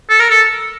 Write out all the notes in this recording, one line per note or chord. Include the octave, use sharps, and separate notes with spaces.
A4
A#4
A4